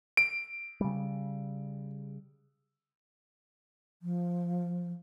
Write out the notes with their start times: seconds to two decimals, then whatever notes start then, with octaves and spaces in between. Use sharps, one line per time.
0.17 D7
0.81 C#3 G3
4.02 F3